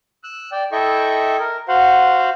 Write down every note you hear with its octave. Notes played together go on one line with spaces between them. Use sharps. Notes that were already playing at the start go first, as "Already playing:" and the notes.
E6 F#6
D5 G5
E4 A4 D#5 E5 G5 C#6
A#4
F#4 C5 F5 F#5